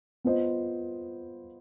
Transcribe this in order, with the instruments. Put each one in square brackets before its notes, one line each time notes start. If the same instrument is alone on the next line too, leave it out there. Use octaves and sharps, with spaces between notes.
[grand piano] B3 F4 C5 D#5